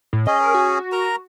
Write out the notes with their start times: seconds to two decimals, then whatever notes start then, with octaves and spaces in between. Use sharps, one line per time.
0.13 A2
0.27 C#4 G#4 D#5
0.40 A#4
0.54 F#4
0.92 A#4 A#5